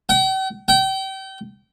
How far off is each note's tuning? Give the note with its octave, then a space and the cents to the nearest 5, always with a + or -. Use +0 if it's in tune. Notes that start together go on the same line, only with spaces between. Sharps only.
G5 -45
G5 -30